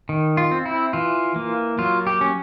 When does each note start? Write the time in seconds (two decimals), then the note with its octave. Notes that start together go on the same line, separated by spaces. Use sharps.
0.09 D#3
0.37 F4
0.51 C4
0.66 E4
0.93 E3 F4
1.36 A#3
1.79 F#3 F4
2.07 G4
2.21 C#4